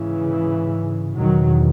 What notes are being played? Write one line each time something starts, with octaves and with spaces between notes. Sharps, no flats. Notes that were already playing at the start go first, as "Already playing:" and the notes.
Already playing: G#2 C#3 E3
E2 B2 D#3 F#3